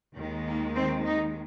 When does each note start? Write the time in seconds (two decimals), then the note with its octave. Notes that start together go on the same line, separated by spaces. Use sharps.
0.16 D#2 D#3 G#3
0.46 A#3
0.75 C4
1.06 D#4